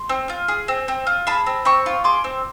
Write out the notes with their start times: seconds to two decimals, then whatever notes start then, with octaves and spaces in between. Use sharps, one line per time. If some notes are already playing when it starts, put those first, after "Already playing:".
Already playing: C6
0.09 C4
0.30 F4
0.48 G#4
0.68 C4
0.88 C4
1.07 F4
1.27 G#4 A5 B5
1.46 C4
1.65 C4 B5 C#6
1.86 F4
2.04 G#4 C6 D6
2.24 C4